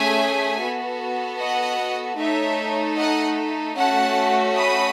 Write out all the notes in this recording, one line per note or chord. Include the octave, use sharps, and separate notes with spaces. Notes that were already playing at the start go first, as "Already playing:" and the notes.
Already playing: A3 C#4 G#4 E5 G#5
B3 F#4 A4
D#5 F#5
A3 D#4 A4 C#5 E5
D#5 F#5
A3 C#4 F#4 F#5 A5
B5 D#6